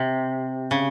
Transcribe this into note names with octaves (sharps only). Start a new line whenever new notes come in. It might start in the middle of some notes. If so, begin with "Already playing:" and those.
Already playing: C3
C#3